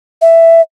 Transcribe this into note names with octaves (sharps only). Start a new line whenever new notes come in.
E5